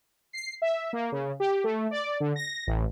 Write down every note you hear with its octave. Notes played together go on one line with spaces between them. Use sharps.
C7
E5
A#3
C#3
G4
A3
D5
D3
A#6
A1